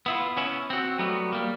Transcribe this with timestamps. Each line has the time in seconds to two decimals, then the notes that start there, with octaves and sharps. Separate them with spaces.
0.06 B3 E4 F4
0.37 B3 C#4 E4
0.70 C4 F#4
0.99 F#3 G3 A3 B3
1.33 G3 A#3